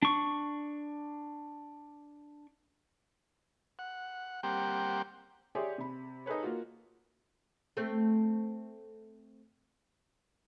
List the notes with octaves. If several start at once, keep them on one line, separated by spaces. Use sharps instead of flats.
D4 C#6
F#5
G3 A#3 C4 G4 F#5 G5
G4 G#4 C#5 D5 E5 C6
C3 B5
D#4 G#4 A4 B4 C#5
A#3 F4 F#4
A3 C4